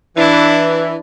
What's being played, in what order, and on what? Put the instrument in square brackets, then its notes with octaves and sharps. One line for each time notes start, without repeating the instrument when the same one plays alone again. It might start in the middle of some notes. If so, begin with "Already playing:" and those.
[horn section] E3 [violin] D4 E4